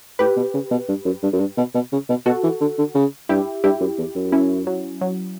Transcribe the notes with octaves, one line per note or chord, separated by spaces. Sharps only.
A2 G4 B4
B2
C#3
B2
G2
F#2
G2
F#2
G2
B2
B2
C#3
B2
B2 F#4 A4
E3
D3
D3
C#3
G2 E4 G4
G2 E4 G4
F#2
E2
F#2
C#4 E4
F#3
F#3